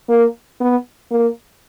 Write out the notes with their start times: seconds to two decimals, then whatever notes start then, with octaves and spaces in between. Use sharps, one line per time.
0.09 A#3
0.61 B3
1.11 A#3